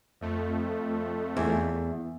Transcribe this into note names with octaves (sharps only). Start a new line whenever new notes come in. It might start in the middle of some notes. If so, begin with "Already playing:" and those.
F2 A3
E2